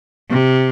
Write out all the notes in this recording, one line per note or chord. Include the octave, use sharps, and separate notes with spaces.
C3